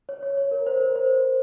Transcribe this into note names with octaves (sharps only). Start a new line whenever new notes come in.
C#5
C#5
C#5
A#4
C5
A#4
C5